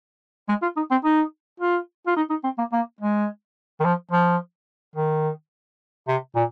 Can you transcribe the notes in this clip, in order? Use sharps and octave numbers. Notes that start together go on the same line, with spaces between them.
G#3
F4
D#4
C4
D#4
F4
F4
D#4
D#4
C4
A#3
A#3
G#3
D#3
F3
F3
D#3
C3
A#2